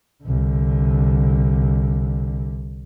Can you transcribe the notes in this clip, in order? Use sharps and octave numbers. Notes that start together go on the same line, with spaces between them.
C2 D3